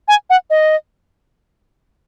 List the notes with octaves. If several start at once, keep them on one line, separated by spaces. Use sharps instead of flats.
G#5
F#5
D#5